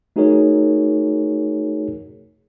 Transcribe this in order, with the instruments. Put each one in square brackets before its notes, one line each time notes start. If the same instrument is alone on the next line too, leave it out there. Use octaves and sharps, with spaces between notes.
[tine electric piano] A3 D#4 F#4 G#4 A#4 C#5